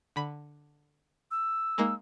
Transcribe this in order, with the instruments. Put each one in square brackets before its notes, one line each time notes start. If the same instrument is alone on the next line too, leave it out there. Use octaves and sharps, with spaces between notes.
[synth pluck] D3 B5
[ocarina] E6
[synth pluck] G#3 A#3 D#4